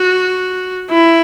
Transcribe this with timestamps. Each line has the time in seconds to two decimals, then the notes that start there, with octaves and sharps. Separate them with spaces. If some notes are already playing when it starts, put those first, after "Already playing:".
Already playing: F#4
0.90 E4